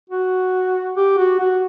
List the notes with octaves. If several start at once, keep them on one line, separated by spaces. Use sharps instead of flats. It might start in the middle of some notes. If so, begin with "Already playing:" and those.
F#4
G4
F#4
F#4